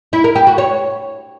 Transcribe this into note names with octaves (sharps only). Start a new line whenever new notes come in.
E4
A#4
G4
F#4
C#5